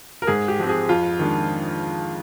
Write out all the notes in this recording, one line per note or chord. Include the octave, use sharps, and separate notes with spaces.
A#4
G#2 G#4
G4
F3 G#3 C4
G#4
F2 F4
D#3 G#3 D4